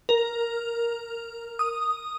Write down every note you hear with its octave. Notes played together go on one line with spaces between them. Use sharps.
A#4
D#6